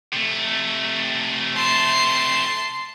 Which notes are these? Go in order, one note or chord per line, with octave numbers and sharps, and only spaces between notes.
C3 A3
A5 C6